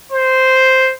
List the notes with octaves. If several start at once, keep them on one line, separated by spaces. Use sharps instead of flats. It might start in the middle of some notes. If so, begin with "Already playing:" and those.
C5